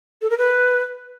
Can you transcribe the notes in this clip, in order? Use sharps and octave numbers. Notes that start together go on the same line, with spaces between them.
A4
A#4
B4